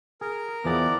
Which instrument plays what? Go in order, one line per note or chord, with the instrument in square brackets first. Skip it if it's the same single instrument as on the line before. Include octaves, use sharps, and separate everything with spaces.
[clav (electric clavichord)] G#4 [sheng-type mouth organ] A#4
[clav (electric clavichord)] E2 F3 G#4 [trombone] E3 [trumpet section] B3 D5